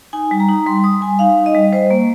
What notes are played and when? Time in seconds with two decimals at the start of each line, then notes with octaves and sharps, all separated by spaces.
0.13 D#4 G#5
0.31 G3
0.40 A#5
0.49 D#4
0.66 G3 C6
0.84 G3 D#6
1.01 G3 G#5
1.19 D#4 F5
1.37 D#4
1.46 D#5
1.55 G3
1.72 G3 C5
1.91 A#3